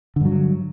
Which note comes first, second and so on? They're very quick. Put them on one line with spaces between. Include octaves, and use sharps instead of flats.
D3 G2 F#3